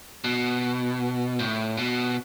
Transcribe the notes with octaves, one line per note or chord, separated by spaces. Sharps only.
B2
A2
B2